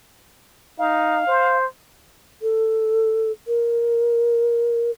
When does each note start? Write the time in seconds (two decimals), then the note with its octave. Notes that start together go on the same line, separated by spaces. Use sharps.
0.79 D#4 F5
1.27 C5
2.42 A4
3.47 A#4